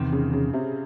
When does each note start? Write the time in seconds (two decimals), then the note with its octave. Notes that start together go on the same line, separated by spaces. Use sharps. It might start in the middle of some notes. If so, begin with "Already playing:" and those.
Already playing: E2 C3 D#3
0.12 C#3
0.33 C#3
0.53 C3